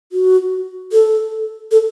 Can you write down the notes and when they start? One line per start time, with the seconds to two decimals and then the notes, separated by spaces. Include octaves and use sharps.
0.12 F#4
0.92 A4
1.71 A4